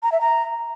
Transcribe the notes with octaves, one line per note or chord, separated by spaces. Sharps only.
A#5
E5
A#5